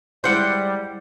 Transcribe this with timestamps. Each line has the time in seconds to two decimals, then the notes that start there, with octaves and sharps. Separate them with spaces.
0.24 G3 G#3 E4 C5 F#5 G5